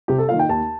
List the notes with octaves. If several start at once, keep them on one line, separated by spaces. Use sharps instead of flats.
C3 G4
A4
D#3 A#3 F4 F5
G5
D#2 A5